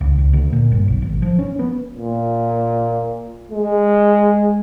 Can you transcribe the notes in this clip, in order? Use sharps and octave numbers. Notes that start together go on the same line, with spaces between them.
C#2
C#2
D2
A#2
G1
B1
G#1
F3
C#4
B3
A#2
G#3